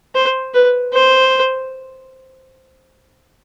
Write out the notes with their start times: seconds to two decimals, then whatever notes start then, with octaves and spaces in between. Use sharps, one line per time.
0.15 C5
0.54 B4
0.93 C5